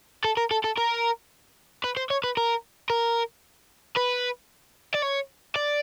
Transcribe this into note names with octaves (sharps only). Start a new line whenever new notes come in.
A4
A#4
A4
A4
A#4
B4
C5
C#5
B4
A#4
A#4
B4
D5
C#5
D5